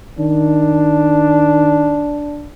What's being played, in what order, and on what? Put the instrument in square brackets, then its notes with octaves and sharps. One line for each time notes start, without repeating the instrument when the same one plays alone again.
[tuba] D#3 [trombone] D4